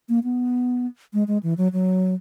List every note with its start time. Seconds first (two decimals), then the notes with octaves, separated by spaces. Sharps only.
0.09 A#3
0.24 B3
1.13 G#3
1.28 G#3
1.43 E3
1.58 F#3
1.73 F#3